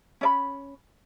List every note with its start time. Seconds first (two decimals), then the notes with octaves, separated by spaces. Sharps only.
0.21 C#4 D5 B5